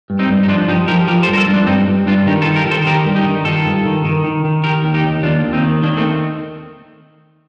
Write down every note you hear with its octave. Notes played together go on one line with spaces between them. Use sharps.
G2
C4 D#4
G2
D#4
F3 D4 F4
F3 D#4 G4
F3 G4 A#4
F3 G4 A#4
A4 C5
G2
A#4
F4 A4
G2
D4 F4
G2 C4 D#4
G2
G2 D4 F4
D#3 D#4 G4
F4 A4
D#3
G4 A#4
D#3
A4 C5
D#3 G4 A#4
G2
D#4 G4
D#3
D#3 F4 A4
G2
D#3
D#3
D#3
D#3
D#3 G4 A#4
D#2
D#4 G4
D#2
D#2 D4 F4
D#2
C4 D#4
D#3
D#3 A#3 D4
A3 C4